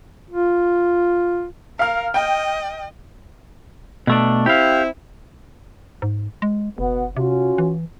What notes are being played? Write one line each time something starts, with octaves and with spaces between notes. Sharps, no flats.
F4
A#4 F5 F6
D#5 G5
B2 A3 D4
C4 E4 G4 F5
G#2
G#3
F#1 B2 B3 F#5
C3 C#4 F4 F#4
E3